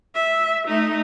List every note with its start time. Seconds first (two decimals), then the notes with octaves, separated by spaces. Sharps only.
0.15 E5
0.67 A3 D#4